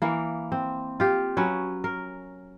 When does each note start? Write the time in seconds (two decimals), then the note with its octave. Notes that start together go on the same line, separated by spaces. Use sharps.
0.02 E3 A#3
0.52 C4
1.00 F4 G4
1.37 F#3 C#4 B4
1.84 A#4